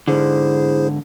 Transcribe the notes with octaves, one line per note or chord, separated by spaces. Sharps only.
G#2 D3 E4 G#4 C5